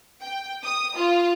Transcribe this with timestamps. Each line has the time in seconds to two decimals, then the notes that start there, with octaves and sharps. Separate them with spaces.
0.21 G5
0.64 D#6
0.96 F4